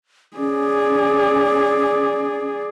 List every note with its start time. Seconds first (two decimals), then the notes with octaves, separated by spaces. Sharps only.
0.38 C#4 G#4 D5